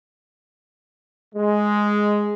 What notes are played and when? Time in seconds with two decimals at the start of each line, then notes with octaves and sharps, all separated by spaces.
1.35 G#3